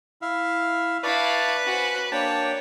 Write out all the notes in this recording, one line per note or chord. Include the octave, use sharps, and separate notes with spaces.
E4 E5 F5
E4 B4 D5 F5 A5 C#6
C#4 F#4 C5
A#3 D4 C#5 G5 A5